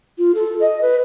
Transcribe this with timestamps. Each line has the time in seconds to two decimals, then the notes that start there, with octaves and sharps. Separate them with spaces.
0.18 F4
0.35 A4
0.61 D#5
0.82 B4